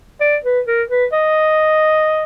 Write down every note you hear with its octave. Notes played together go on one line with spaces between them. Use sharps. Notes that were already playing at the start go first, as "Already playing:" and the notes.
D5
B4
A#4
B4
D#5